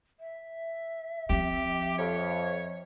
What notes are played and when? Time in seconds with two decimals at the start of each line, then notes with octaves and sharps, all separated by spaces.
0.20 E5
1.30 F3 C4 G4
1.98 F2 C#5